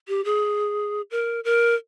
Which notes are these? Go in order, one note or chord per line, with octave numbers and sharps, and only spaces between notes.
G4
G#4
A#4
A#4